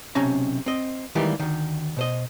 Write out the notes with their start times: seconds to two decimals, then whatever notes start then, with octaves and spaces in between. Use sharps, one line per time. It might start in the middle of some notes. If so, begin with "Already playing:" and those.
0.15 B1 C3 A3 C#4 A5 A#5
0.66 C4 D#5
1.15 D#3 E3 G3 G#3 A#3 G4
1.40 D2 D#3
1.97 B2 C5 D#5